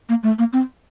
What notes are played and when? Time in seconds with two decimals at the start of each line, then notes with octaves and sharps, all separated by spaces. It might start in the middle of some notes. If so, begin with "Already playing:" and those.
0.09 A#3
0.23 A3
0.39 A#3
0.53 C4